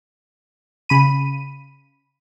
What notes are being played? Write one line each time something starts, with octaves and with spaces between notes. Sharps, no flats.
C#3 B5 D#7